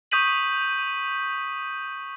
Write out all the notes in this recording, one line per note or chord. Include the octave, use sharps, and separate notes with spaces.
C#6 D#6 G6 B6 D#7 F#7